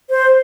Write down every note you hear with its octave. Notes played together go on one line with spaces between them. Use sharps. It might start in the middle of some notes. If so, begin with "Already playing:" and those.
C5